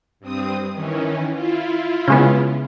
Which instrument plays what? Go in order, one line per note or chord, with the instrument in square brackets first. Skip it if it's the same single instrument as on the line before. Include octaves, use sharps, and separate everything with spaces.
[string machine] G2 C4 D#6
D#3 E3 C#4
E4 F4
[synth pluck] C#3 G#3 B3